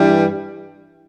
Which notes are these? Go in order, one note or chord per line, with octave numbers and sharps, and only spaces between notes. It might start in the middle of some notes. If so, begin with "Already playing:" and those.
Already playing: G2 E3 G3